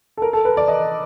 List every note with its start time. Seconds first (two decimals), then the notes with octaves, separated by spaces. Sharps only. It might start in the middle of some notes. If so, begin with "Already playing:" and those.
0.17 A4
0.22 A#4
0.33 A4
0.45 B4
0.57 D5
0.68 D#5